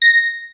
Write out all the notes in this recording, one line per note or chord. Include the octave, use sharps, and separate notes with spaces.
A#6